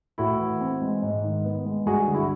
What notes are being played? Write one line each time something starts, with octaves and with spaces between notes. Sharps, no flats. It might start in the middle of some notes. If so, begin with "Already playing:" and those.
A2 E4 F#4
E3
C4
G#3
G#2
D#3
B3
G#3
G2 F#4 G#4
D3
E4 F#4